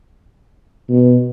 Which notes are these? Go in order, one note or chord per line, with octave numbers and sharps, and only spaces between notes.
B2